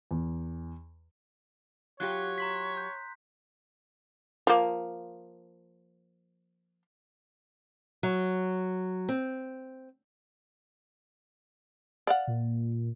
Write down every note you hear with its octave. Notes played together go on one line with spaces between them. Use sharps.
E2
F#3 F4 G4 C#5 F#6
A#5 C6 B6
G6
F3 A#3
F#3
C4
D5 F5 F#5
A#2